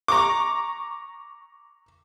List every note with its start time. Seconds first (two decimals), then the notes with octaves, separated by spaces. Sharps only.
0.08 A#5 C#6 D6